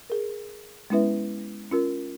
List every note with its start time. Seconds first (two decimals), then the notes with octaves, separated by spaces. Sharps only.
0.10 G#4 A#4
0.90 G#3 B3 C#4 E4 B4 E5
1.71 C#4 F4 A#4